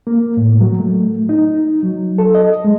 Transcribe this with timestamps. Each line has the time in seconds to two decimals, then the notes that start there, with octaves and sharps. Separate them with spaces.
0.07 A#3
0.37 A2
0.61 F#3
0.80 A3
1.29 D#4
1.82 F#3
2.18 A4
2.35 D#5
2.65 G#3